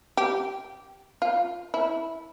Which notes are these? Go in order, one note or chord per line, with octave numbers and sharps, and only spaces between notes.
G4
F4
E4